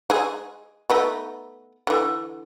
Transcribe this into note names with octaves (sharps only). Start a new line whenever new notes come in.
G#3 G#4
A3 B3 D#4
D3 E3